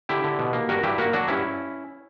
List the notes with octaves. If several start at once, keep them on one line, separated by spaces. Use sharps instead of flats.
D3 E4 G4
D3
B2
A#3
G2 F#4 A#4
G2 E4 G4
A#3 F#4 A#4
F#3 D4 F#4
G2 C#4 E4